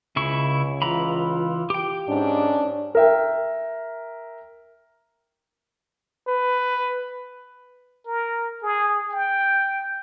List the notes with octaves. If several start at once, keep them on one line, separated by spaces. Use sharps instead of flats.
C#2 C#3 E4 C#6
E3 F4 A#5 B5
G4 G5
G#2 C#4 D4
A#4 E5 G5
B4
A#4
G#4
G5